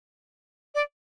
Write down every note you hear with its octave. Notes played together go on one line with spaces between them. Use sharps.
D5